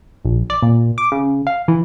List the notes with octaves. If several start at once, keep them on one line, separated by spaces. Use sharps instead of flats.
A#1
D5
A#2
D6
C#3
F5
E3